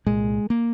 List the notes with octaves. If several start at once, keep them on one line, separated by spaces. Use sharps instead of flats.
C2 A#2 G#3
A#3